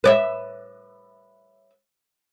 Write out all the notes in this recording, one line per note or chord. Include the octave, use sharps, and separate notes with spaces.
B4 D5 E5